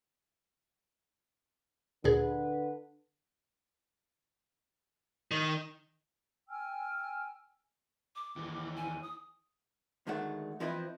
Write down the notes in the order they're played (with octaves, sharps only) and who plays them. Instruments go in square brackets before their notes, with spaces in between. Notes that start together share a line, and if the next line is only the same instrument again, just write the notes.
[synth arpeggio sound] D2 A#2 G#4 [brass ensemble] D3 B4
[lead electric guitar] D#3
[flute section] G5 G#5 E6 F6
[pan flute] D6
[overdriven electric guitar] D#2 E3
[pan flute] G#5
D#6
[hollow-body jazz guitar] D2 D#3 G#3 A3 F#5
E3 F3 C4 E4 B4 D#5